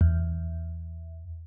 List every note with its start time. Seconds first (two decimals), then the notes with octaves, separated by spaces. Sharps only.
0.01 E2